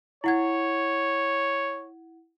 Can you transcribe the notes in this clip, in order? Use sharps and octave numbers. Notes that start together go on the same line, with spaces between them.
E4 C#5 F#5 G#6